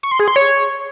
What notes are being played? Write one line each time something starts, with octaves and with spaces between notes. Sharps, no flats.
C#6
C6
G#4
C6
C#5